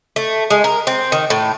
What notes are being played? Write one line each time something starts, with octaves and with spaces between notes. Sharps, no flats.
A3
G#3
A#4
C4
D#3
A2